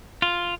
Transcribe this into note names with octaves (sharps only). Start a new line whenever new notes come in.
F4